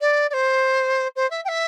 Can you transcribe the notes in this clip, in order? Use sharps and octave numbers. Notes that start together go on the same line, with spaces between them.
D5
D5
C5
C5
E5
G5
E5